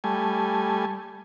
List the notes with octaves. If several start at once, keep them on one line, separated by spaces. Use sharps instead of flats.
G3 A3 G#5